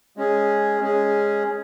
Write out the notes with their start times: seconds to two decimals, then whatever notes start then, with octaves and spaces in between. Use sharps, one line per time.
0.17 G#3 C#4 G#4
0.80 G#3 C#4 G#4